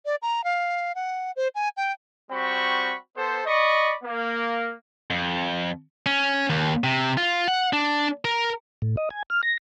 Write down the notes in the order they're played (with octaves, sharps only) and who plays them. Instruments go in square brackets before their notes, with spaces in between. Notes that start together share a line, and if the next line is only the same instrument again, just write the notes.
[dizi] D5
A#5
F5
F#5
C5
G#5
G5
[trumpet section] G3 C4 F#4 B5 C#6
B3 A4 C5
D5 D#5 B5 C#6
A#3
[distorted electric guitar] F2
C#4
D#2
C3
F4
F#5
D4
A#4
[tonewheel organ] A2
D#5
G#5
F6
A#6